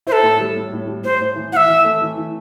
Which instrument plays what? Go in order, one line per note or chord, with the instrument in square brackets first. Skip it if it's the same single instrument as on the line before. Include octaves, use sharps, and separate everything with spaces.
[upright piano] E4 [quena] C5
[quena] A4
[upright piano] A2
G3
A2
A2
G3
[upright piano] A2 [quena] C5
[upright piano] A2
E3
[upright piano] E3 [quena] F#5
[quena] E5
[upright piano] E3
A3
E3
E3